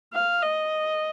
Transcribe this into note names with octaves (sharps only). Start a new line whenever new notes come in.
F5
D#5